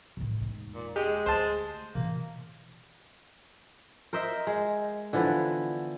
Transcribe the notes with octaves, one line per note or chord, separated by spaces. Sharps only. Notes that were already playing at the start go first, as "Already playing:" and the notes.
A2 D#3
E1 D#4
A#2
G#3 G4
D2 C5 A5
B2 E3 A#3
A#4 C5 D#5 E5
G#3
D3 E3 F3 B3